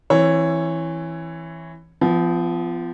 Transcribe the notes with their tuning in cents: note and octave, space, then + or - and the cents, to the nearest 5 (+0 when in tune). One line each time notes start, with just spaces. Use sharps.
E3 +0 C4 +35 C#5 +0
F3 -20 B3 +35